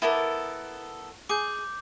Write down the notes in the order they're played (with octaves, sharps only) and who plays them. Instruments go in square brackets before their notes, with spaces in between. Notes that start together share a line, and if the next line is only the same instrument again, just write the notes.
[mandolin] B3 A4 A#4 [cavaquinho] E4 D6
[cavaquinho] G#4 [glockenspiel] D6 G6